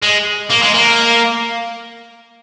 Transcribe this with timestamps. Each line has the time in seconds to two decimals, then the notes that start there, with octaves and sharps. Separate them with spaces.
0.02 G#3
0.50 A#3
0.62 G#3
0.74 A#3